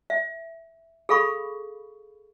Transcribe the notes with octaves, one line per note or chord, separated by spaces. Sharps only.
E5
G#4 A4 F5 B5 C#6